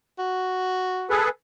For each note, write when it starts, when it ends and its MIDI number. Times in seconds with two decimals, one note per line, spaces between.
0.18 1.13 66
1.10 1.29 68
1.10 1.29 69
1.10 1.29 71